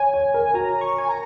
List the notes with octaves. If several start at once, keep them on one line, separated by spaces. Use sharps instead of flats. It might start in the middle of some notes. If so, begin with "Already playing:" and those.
Already playing: C#5 G#5
C#5
A#4
F#4 A#5
C#6
G#5
A#5